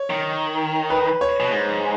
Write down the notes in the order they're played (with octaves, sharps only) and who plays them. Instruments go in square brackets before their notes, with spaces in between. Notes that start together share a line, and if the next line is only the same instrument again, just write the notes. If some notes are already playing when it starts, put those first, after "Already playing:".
Already playing: [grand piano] C#5
[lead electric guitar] D#3
[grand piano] B4
C#5
[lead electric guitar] B2
G#2